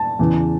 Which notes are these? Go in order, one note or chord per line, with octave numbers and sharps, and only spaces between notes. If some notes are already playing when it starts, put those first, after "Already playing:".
Already playing: A5
E2 C#3 E3